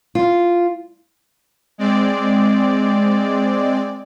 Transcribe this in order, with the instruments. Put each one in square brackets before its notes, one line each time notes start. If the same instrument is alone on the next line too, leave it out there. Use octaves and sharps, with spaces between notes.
[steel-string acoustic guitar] F4
[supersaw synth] G#3 C4 D5